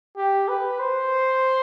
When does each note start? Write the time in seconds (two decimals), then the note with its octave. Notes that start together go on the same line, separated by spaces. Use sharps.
0.17 G4
0.48 B4
0.79 C5